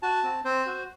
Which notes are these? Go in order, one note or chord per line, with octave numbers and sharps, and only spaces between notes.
F#4 A5
C4
C4 C5
F#4